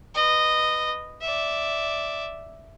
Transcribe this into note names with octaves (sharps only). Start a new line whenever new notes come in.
B4 D#5
D5 E5